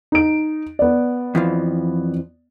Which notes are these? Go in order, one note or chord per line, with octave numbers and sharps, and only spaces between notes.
D#4 D7
B3 D5
F2 E3 F3